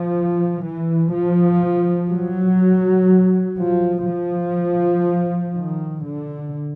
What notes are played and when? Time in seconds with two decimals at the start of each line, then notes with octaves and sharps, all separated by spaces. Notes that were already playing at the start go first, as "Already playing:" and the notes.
Already playing: F3
0.64 E3
1.13 F3
2.10 F#3
3.59 F3
4.07 F3
5.54 D#3
6.03 D3